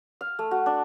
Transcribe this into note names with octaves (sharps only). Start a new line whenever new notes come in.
F5
A3
F#4
D4